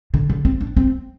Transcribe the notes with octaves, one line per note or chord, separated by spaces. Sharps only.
D3
D3
C4
D4
C4